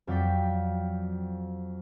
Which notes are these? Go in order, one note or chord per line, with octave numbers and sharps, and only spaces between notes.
F2 F#3 D5 G5 B6